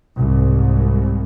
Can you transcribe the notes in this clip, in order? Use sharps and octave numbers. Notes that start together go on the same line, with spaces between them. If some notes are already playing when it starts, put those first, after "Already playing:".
C2 G#2